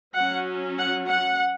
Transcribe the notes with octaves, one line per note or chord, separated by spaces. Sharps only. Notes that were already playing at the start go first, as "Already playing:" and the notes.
F#3 C#4 F#5
F#5
F#5